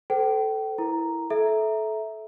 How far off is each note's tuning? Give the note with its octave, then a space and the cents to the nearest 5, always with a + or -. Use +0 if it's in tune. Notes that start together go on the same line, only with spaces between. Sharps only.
A4 +0 C5 -40 G5 -30
E4 +0 A#4 +10 A#5 +0
A4 -25 E5 -10 A#5 +0